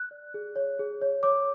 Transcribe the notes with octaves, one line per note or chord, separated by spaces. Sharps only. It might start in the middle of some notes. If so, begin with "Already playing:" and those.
Already playing: F#6
D5
G#4
C#5
G#4
C#5
C#5 D6